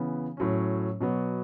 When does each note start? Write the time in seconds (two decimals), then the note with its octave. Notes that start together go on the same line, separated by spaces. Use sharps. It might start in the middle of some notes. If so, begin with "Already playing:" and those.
Already playing: C#3 E3 B3
0.37 A2 F#3 C#4
1.01 B2 F#3 B3